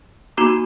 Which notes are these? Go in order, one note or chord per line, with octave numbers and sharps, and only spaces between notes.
A#3 D#4 F#4 A#5 D6